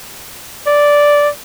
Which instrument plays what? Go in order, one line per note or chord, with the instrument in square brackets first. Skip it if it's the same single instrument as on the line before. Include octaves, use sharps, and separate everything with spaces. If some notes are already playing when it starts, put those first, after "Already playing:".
[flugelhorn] D5